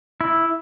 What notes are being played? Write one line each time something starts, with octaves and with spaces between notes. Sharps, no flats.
E4